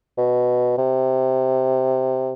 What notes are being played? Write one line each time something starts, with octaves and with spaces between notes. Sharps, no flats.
B2
C3